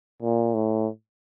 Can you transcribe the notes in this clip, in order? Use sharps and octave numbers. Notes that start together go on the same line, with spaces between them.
A#2
A2